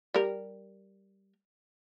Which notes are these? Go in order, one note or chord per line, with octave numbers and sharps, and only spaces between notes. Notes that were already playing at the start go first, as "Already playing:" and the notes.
G3 A#4